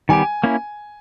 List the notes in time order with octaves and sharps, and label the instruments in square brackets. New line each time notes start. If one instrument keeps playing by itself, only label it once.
[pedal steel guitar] D#3 G3 B3 G4 [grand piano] G#5
[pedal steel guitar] A#3 C#4 E4